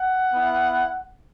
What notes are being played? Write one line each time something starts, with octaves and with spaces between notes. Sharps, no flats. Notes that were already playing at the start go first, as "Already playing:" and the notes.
Already playing: F#5
B3 E4